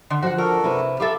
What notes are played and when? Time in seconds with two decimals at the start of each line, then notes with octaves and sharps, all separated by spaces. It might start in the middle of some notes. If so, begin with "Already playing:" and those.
0.10 D3
0.22 F3 F#4 F#5
0.38 D4 F#4 A4 A#4
0.64 C3 E4 B4
1.00 G4 A4 E5 F5 A#5 B5